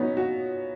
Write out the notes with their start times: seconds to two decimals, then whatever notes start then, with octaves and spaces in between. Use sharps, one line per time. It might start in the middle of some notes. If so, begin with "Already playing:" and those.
Already playing: A#2 F#3 B3 C#4 D#4
0.17 F#4